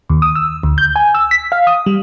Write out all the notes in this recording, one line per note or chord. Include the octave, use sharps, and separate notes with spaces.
D#2
D#6
E6
D2
G6
G#5
E6
B6
F5
D#6
G3